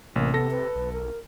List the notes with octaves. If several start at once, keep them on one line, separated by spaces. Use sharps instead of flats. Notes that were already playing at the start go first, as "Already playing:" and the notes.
A1 C3 A#3
B3 A4 A#6
B4
B1
A#4